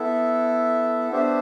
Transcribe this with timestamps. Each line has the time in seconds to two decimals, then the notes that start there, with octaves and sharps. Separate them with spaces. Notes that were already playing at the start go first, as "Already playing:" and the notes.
Already playing: B3 E4 A4 E5
1.12 B3 D4 G4 C5 E5